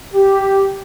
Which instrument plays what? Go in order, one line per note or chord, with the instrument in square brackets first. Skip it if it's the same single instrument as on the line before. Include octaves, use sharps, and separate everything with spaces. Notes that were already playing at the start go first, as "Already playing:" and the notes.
[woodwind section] G4